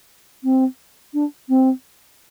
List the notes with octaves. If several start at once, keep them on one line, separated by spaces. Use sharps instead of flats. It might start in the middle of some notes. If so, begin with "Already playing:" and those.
C4
D4
C4